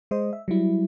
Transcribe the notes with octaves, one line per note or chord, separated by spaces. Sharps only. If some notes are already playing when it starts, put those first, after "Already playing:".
G#3 C5 D#5
E5
F#3 G3 E4